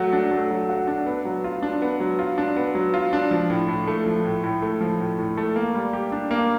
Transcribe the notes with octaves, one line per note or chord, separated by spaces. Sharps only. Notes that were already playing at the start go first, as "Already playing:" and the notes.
Already playing: F#3 A3 F#4
D4
A3
F#3
F#4
D4
B3
F#3
F4
D4
B3
F#3
F4
D4
B3
F#3
F4
D4
F3
A2
A2
A3
F3
A2
A2
A3
F3
A2
A2
A3
A#3
G3
G4
D4
A#3